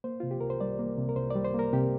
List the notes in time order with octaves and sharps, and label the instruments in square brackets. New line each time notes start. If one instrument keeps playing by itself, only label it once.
[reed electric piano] A#3 C5
C3 F4
G4
C2 A#4
C5
G3 D5
A#3
C3
A#4
C2 C5
D5
G3
C5
A#3
A#4
C3 G4